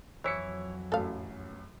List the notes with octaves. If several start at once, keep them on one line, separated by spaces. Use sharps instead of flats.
F2 E3 F#3 E4 C#5 B6 C#7
A1 F#2 A4 F5